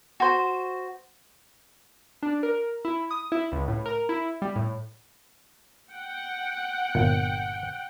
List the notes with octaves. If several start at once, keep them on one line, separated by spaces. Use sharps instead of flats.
F#4 C5
D4
A#4
E4
D#6
E4
C#2
A2
A#4
E4
G3
A2
F#5 G5
G1 A#2